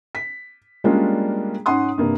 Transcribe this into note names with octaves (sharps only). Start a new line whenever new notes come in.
B6
G3 G#3 A#3 C#4 D4 F4
G#2 C#4 F#5 C6 D#6
G2 C3 A#3